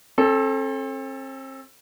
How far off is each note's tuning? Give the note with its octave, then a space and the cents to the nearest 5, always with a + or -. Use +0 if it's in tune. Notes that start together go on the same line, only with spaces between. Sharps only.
C4 +40 A4 -10